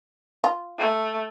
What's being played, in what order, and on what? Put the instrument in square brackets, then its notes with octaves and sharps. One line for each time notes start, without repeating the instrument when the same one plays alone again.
[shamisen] F4
[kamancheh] A3